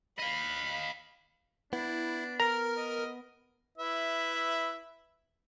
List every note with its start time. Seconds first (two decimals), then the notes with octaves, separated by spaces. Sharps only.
0.19 D#5 F5 B5
1.73 B3 D4 E4
2.40 A#4 A#5 F6
2.77 D#5
3.78 E4 B4 E5